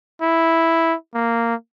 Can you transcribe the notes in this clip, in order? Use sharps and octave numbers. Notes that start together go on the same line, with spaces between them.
E4
A#3